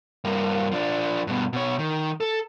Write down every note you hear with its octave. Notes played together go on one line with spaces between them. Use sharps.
G2 A#3
F3 D4
G2 B2
B2 C#5
D#3
A4